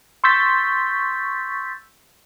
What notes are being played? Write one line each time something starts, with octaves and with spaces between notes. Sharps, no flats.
C6 C#6 E6 G6 A6 B6